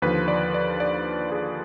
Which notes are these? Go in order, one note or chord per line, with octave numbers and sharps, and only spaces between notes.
D#2 D3 F3 B4
D5
D5
D5
G#4